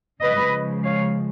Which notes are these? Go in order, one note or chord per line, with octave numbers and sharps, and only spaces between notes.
C#3 F3 G#3 B4 D#5
C#5 F5